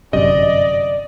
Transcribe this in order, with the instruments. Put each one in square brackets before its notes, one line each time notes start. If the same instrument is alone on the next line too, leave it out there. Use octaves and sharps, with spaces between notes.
[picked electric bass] G1 F#2 C3 [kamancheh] D5 [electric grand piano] D#5